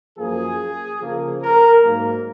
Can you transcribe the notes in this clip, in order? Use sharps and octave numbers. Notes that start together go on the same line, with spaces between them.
F#2 F3 A#3 G#4
C#3 F3 A#3
A#4
G#2 F#3 A#3